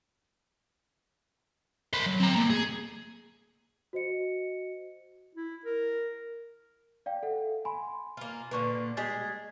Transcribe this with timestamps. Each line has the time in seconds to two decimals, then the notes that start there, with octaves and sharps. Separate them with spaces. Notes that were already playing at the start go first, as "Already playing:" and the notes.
1.93 C5 B5
2.06 F#3
2.20 C4 A#5
2.35 A2 A#3
2.50 G#4
3.93 F#4 C5 D#5 C#7
5.35 E4
5.65 A#4
7.06 D5 F5 G5
7.23 A4 E5 F#5
7.65 G#5 B5 C6
8.17 A#3 F4
8.51 A#2 D3 A#3 B4 C#6
8.97 G3 G#3 G#4 A6 B6